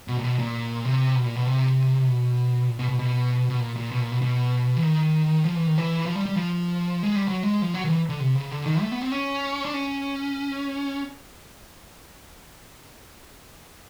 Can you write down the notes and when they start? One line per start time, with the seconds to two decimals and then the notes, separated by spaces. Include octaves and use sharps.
0.08 B2
0.19 A#2
0.24 B2
0.39 A#2
0.85 C3
1.15 B2
1.26 A#2
1.36 B2
1.46 C3
2.07 B2
2.68 A#2
2.79 B2
2.89 B2
2.99 B2
3.50 B2
3.60 A#2
3.76 A#2
3.91 B2
4.01 A#2
4.11 B2
4.22 B2
4.76 E3
4.83 D#3
5.44 F3
5.56 E3
5.67 D#3
5.78 E3
6.05 F3
6.15 G3
6.26 G3
6.36 F3
7.03 G#3
7.16 G3
7.28 F#3
7.43 G#3
7.62 F3
7.74 F#3
7.84 D#3
7.89 E3
8.09 D3
8.20 C3
8.35 C#3
8.51 D3
8.66 D#3
8.81 A3
8.92 B3
9.02 C4
9.12 C#4
9.65 D4
9.74 C#4